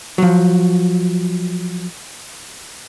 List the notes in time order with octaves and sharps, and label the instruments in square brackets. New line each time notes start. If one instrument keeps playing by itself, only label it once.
[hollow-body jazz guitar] F3 F#3